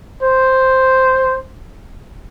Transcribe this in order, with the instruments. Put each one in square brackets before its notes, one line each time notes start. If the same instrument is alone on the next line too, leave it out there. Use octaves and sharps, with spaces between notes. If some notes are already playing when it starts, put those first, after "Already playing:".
[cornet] C5